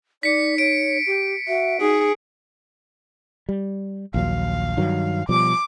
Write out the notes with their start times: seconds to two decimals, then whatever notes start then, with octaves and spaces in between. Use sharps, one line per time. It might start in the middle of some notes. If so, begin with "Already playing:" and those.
0.23 D#4 D5 B6 C#7
0.58 C#5 D7
1.07 G4
1.48 F#4 E5
1.80 D#4 G#4
3.49 G3
4.14 A#1 D#2 F#3 F5
4.77 G2 D#3 F#3
5.29 B2 F3 G3 D6